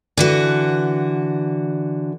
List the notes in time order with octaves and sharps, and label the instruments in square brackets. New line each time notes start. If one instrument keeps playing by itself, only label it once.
[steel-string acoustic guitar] D3 E3 F#4